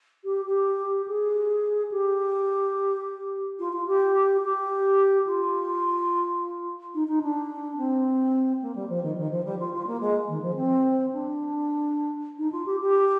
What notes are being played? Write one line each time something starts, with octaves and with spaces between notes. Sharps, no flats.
G4
G4
G#4
G4
F4
F4
G4
G4
F4
D#4
D#4
D4
C4
A#3
G3
F3
D#3
D#3
F3
G3
F4
F4
A#3
G#3
D#3
F3
C4
D4
D#4
F4
G4
G4